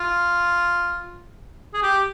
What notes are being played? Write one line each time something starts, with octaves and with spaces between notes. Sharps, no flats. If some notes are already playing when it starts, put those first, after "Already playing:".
Already playing: F4
G#4
G4